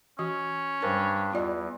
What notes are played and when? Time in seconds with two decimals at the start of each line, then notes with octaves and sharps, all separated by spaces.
0.19 E3 C#4 F#4
0.82 G2 G3 D4 A#4 C5
1.33 E2 F4 D5 D#5